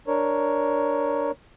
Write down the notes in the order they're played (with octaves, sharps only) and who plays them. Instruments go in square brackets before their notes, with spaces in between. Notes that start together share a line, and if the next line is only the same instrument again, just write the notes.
[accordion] D4 A#4 C#5